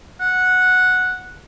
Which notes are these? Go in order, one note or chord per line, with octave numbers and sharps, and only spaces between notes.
F#5